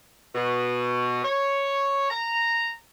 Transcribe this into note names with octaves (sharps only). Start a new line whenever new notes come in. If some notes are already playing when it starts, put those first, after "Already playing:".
B2
C#5
A#5